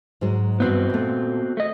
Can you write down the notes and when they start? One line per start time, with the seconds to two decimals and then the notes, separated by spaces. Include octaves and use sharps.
0.21 G#2 F#3 G#3
0.60 G2 E3 B3 C4 E4 F#4
0.90 A#2 A3
1.57 A3 D#5